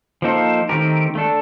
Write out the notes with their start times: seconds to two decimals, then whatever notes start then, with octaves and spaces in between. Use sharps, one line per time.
0.22 F3 A#3 D#4 A4 C5
0.69 D#3 A3 C4 G4 A#4
1.15 A3 D4 A4